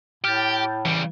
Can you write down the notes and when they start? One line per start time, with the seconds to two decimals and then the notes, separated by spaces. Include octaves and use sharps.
0.24 A2 G4 F6 G6 A6
0.85 C#3 E3 G3